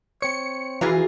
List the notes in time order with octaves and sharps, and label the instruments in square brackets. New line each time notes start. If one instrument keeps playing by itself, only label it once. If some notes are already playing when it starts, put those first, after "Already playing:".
[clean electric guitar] C4 C#5 [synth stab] C#7
[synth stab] E3 [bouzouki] F4 G#4 A#5 [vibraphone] F#4